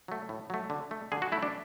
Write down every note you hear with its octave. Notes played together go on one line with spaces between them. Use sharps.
F#3 A3
A2
F#3 A3
D3
A3
D3 G#4
F#4
A3 E4
D4